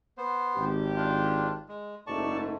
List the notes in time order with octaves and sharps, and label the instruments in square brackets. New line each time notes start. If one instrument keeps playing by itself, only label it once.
[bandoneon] B3 C5
[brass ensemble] G#1 G4
[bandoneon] D4 F4
G#3
[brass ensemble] F#1 G#2 A3 [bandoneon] D5 A5 C#6